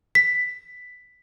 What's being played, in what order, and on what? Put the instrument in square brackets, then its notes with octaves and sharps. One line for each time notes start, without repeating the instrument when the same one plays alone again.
[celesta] B6